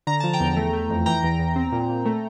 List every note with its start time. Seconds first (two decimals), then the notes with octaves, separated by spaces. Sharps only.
0.07 D3 A#5
0.20 F3 A5
0.33 G5 A#5
0.40 E2
0.57 A3
0.73 A3
0.90 F2
1.06 E3 G5 A#5
1.23 E2
1.39 E2
1.56 C4
1.72 A#2
1.89 A#2
2.06 A3